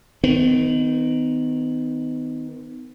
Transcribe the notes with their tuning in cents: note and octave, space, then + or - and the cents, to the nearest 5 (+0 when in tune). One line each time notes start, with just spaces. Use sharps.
D#3 +0 B3 +40